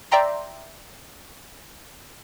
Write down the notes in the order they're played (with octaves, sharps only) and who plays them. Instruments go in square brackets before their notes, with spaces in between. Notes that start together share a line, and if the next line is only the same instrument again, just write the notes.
[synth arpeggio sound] D5 E5 G5 A#5 C6